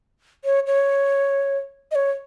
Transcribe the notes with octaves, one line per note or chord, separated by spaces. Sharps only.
C#5
C#5
D#5
C#5